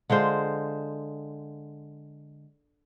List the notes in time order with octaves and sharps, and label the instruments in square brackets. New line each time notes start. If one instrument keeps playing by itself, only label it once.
[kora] D3 G#3 F4 C5